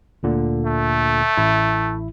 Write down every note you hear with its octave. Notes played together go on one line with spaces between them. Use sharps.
D2 A#2 D3
A3
A1 E4